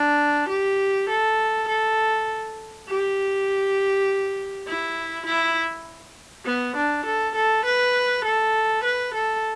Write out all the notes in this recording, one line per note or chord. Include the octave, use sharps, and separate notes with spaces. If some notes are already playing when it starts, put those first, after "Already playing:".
Already playing: D4
G4
A4
A4
G4
E4
E4
B3
D4
A4
A4
B4
A4
B4
A4